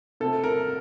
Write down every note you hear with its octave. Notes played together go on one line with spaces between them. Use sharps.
C3 A4
A#4